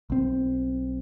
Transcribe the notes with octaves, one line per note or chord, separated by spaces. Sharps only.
B1 C4